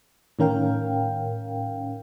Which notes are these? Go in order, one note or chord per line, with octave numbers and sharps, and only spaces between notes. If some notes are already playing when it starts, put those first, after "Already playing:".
A2 D#3 C#4 A#4 F5 G5